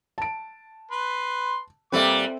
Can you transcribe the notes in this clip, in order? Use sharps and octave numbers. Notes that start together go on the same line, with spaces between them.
A5 D7
B4 C6
A#2 G3 C4 A4 B4 E5 D6